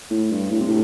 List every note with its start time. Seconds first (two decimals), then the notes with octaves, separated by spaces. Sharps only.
0.10 A2
0.32 G2
0.51 A2
0.61 C3
0.69 A2